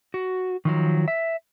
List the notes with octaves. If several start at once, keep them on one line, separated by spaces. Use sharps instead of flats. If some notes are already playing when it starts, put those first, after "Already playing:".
F#4
D#3 F3 F#3
E5